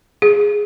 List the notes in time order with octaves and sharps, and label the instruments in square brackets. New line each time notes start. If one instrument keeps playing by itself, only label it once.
[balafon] G#4